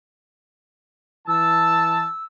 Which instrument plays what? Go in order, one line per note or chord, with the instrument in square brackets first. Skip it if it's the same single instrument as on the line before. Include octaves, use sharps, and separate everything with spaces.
[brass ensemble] E3 A5 [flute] E6